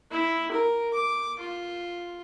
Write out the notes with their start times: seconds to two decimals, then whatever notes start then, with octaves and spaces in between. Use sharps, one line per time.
0.11 E4
0.51 A#4
0.94 D6
1.39 F4